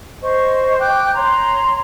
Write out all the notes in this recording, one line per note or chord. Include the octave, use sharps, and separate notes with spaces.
C5 D#5 C#6
G5 D6 F#6 G6
C#5 A#5 C6